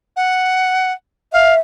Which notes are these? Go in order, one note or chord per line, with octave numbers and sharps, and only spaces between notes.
F#5
E5 F5